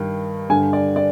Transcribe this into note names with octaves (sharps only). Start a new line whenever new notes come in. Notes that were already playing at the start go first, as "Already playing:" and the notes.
Already playing: G2 D#3
G2 D3 G#5
D5
D5